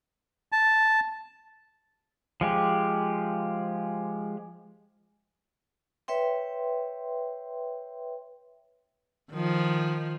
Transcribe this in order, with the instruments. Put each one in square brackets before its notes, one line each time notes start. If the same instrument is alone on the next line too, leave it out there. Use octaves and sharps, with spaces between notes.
[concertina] A5
[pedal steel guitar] F3 G#3 G4
[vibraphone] B4 C#5 E5 G5 C6
[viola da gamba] D#3 F3